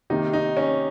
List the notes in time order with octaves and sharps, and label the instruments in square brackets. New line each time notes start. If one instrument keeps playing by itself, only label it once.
[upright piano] C3 D#3 A#3 [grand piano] D#4
[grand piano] D#4
C#4